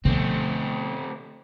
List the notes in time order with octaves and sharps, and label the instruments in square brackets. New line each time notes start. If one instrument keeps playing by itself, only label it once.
[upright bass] B2 [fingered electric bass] D3 F3 B3 [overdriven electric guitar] A3 C4